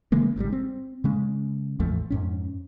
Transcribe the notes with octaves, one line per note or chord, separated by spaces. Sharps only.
C#3 E3 G#3 A#3
G#1 G#2 D3 G3
C4
C#3 G#3 C#4
A1 E2 F3 A3
F2 G#2 C#4